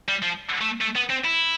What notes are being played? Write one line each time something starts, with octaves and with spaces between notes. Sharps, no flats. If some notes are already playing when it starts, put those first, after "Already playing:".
G3
F3
A3
A3
B3
C4
E4